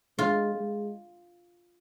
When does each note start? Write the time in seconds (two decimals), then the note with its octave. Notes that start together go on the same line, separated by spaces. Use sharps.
0.18 G#3 F4
0.55 G#3